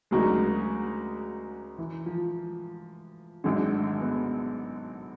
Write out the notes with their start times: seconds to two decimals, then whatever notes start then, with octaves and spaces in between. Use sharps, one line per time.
0.11 D2 C#3 F#3 G#3 A#3 D#4
1.78 E3
2.06 F3
3.44 G#1 F#2 D3 G#3
3.73 A3
4.01 B3